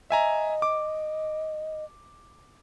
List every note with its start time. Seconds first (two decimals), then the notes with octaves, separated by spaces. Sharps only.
0.10 D#5 E5 G#5 A#5
0.62 D6